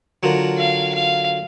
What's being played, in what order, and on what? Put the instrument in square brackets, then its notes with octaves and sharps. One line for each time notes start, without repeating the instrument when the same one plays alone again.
[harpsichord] D3 F#3 D4 F4 A#4
[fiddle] F5
F5